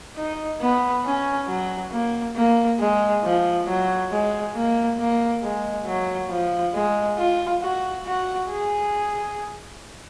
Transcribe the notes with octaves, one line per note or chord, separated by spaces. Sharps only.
D#4
B3
C#4
F#3
A#3
A#3
G#3
F3
F#3
G#3
A#3
A#3
G#3
F#3
F3
G#3
F4
F#4
F#4
G#4